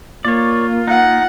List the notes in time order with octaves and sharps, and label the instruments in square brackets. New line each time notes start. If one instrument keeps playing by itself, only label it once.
[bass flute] A#3 [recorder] F4 [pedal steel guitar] C#5 D5
[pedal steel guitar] D#4 [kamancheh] F#5